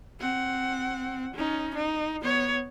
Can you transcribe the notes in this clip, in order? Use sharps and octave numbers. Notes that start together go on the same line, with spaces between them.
C4 F#5
C#4 D#4
D#4
B3 C#5